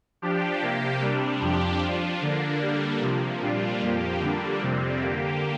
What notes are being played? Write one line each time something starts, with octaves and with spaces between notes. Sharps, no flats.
F3 D4 G4
C3 A#3 G4
C3 G3 D4
F2 F3 D4 G4
F3 D4 F4
D3 A#3 D4
D3 G3 A#3 D4
C3 F3 A#3
A#2 G3 D4 F4
F2 F3 A#3 G4
D3 G3 A#3 D4
F2 C3 G3 C4
D3 A#3 G4